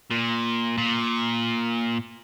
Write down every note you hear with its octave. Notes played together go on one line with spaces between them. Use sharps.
A#2
A#2